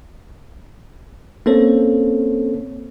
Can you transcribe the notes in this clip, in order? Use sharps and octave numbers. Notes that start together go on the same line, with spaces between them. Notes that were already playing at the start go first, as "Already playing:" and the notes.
A#3 C4 C#4 A4 C5 C#5